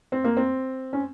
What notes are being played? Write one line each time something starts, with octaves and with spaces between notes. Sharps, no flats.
C4
A#3
C4
C#4